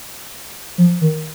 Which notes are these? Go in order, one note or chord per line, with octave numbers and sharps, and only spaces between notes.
F3
D#3